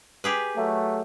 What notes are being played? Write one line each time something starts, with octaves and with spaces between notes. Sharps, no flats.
G4 G#4 B4
F#3 A3